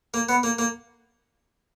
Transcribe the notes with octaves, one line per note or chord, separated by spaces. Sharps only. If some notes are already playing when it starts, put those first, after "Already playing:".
A#3
B3
A#3
A#3